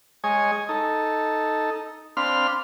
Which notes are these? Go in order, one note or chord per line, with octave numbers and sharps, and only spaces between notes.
G#3 C#5 D#5 G#5
D#4 A4
C4 D4 F5 B5 C6 F6